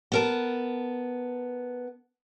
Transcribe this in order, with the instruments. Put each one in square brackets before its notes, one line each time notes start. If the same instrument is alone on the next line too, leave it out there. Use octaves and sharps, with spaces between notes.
[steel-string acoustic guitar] B3 A#4 A5